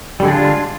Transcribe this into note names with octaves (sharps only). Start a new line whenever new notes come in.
D3 G3 G#3 D4 F4